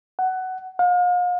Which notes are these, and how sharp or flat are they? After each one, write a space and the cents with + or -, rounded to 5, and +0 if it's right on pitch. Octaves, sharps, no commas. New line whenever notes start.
F#5 +15
F5 +40